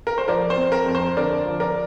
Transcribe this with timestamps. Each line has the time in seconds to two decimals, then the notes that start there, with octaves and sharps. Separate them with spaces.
0.07 A#4
0.18 C5
0.28 F3 A#4 D5
0.50 C5
0.57 C4
0.72 A#4
0.86 F2
0.95 C5
1.17 D3 A#4 D5
1.46 F3
1.60 A#4 D5